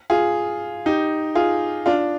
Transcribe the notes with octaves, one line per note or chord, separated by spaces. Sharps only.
F4 G#4
D#4 G4
F4 G#4
D4 F4